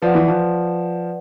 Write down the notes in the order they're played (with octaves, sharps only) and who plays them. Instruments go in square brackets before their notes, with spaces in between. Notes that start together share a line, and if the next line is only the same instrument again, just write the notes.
[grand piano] F3 [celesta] B4 D5 F#5
[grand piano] E3
F3